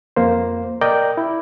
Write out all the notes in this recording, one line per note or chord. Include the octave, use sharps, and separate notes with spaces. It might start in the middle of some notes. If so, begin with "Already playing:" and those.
F2 A#3 C5
A#4 D5 D#5 G5 D6 G6
E4